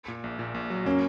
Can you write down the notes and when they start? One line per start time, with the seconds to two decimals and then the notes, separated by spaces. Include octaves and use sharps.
0.08 A#2
0.24 A#1
0.39 A#2
0.54 A#1
0.70 F#3
0.85 A#3 C#4